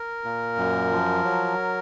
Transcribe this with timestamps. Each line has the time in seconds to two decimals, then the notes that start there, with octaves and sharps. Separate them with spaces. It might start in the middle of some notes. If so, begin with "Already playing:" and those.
Already playing: A#4
0.24 A#2
0.58 F#2
0.92 F3
1.25 F#3